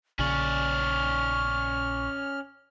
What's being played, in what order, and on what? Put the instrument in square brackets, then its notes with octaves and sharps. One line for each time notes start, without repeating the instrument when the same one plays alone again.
[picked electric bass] A#1 A#2 C#3 [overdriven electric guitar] C#4 D5 [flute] C#6 [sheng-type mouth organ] F6